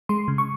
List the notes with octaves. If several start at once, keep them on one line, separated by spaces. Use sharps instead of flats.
G#3 C6
C#3
C#6